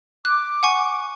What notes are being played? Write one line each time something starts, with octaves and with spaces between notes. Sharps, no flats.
D6 F#6
F#5 G#5 C#6